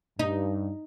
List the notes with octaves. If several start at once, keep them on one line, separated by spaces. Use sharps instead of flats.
G2 D#4